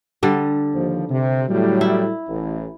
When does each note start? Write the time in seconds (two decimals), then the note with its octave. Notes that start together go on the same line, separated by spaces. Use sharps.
0.23 D3 G3
0.74 D#2 F3
1.10 C3
1.48 A2 F#3 G3
1.81 E4
2.28 A1